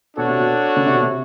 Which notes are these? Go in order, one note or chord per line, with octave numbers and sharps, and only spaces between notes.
B2 D4 F#4 A4 C#5
C3
B2
C#3
C3
B2
C3